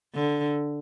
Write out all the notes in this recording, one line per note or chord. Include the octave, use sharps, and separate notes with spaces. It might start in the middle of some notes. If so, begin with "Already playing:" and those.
D3